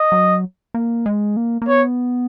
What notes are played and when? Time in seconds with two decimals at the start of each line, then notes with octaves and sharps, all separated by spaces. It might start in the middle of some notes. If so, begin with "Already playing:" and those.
Already playing: D#5
0.12 F#3
0.74 A#3
1.06 G#3
1.37 A#3
1.62 A#3
1.67 B3 C#5